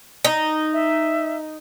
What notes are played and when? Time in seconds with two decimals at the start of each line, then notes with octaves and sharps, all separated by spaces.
0.24 D#4
0.73 E5